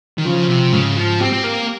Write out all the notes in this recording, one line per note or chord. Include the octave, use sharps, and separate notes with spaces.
D#3
C#3 F3
C3
G#2 C#3
F3
C4 G4
C4
A#3